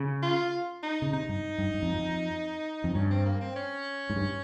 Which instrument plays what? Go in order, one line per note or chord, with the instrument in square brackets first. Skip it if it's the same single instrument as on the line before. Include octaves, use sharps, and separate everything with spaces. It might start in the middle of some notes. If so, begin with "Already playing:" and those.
Already playing: [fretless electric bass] C#3
[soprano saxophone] F4
D#4
[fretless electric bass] C#3
[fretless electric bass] C3 [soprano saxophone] D#4
[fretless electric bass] G2
G2
G2
F2
F2
F2
[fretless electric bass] G2 [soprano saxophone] C#4
[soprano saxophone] C4
A#3
C4
C#4
[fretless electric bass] G#2
G2